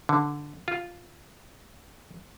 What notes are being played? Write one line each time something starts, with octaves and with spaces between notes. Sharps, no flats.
D3
F4